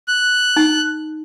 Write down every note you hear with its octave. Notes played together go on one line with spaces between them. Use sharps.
F#6
D#4